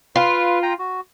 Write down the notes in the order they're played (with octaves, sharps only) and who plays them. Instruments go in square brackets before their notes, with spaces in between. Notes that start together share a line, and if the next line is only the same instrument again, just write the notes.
[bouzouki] F4 [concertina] B4
[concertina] G5 A#5
F#4